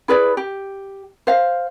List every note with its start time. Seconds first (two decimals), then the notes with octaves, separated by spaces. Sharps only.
0.08 E4 G#4 B4 D5
0.37 G4
1.27 C5 F5